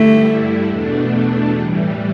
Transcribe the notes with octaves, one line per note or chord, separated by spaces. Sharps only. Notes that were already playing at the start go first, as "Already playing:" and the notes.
Already playing: G2 D3 G3 A3 E4
E2 B2 A3 D4
A2 E3 G3